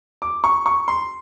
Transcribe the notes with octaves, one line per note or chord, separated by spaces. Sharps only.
D6
C#6
C#6
C6